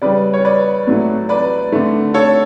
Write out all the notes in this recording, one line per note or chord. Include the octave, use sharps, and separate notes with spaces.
C#3 G3 B4 D5
C#5
B4 D5
A2 F#3 A3
B4 D5
D3 A3
A4 C#5